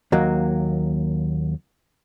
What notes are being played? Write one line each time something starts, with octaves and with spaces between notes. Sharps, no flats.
D#2 F#3 A#3